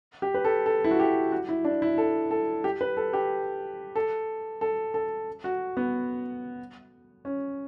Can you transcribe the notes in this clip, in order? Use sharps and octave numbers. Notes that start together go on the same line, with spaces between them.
G4
B4
A4
A4
E4
F#4
G4
F#4
E4
D4
E4
A4
A4
G4
B4
A4
G4
A4
A4
A4
F#4
B3
C#4